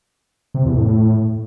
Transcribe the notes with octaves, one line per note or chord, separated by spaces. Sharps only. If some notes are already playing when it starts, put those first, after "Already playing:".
C3
E2
A2